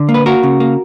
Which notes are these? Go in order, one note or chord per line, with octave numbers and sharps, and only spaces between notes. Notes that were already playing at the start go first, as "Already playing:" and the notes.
Already playing: D3
A#3
B4
A#3 F#4 A#4
C#3
A#3